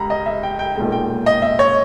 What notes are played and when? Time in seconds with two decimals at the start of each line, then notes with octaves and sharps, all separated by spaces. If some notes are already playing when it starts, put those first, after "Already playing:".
Already playing: C#2 G3 A#5 B5
0.10 D#5
0.26 E5
0.43 G5
0.59 G5
0.76 B1 A#2 G#3 G5
0.92 G5
1.26 D#5
1.42 E5
1.59 C#5